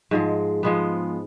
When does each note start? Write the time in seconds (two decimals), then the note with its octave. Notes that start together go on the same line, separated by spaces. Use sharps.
0.11 G#2 F3 G#3
0.63 F3 G#3 B3